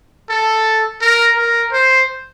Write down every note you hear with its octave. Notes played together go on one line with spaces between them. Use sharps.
A4
A#4
A#4
C5